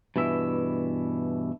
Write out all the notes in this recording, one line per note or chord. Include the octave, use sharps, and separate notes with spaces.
G2 B2 E3 E5